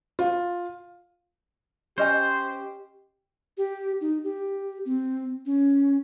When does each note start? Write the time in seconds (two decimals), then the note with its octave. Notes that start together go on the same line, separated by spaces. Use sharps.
0.19 F4
1.98 C#4 G4 C5 D#5 G#5
3.58 G4
4.01 D#4
4.24 G4
4.86 C4
5.46 C#4